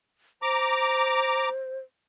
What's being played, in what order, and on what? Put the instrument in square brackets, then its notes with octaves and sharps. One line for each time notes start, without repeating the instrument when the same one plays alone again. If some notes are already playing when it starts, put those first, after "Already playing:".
[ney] C5 [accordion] A#5 D6